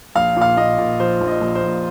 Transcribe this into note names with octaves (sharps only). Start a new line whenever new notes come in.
A#1 F5
A#2
F5
A#2 D#5
A#2
F3 C5
A#1
D#5
A#1
C5
A#1